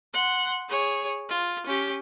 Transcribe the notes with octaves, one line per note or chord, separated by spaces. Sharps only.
F#5 C6
G#4 C#5
F4
C#4 G4